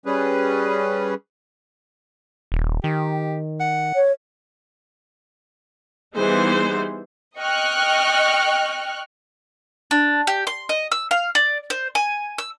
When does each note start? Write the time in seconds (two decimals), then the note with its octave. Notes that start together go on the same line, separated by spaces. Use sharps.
0.06 G3 C#4 G#4 B4
2.52 D#1
2.84 D#3 G4
3.60 F#5
3.95 C#5
6.15 E3 G3 B3 D#4 G#4 C5
7.38 D#5 G5 C#6 F6 F#6
9.91 D4
10.27 G4
10.47 C6
10.69 D#5
10.92 E6
11.11 F5
11.35 D5
11.70 C5
11.95 G#5
12.38 E6